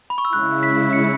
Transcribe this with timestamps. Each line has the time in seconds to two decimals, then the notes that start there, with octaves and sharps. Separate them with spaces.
0.10 B5
0.18 C#6
0.25 E6
0.32 C#3 G#3 E4 F#6
0.63 B6
0.93 C#7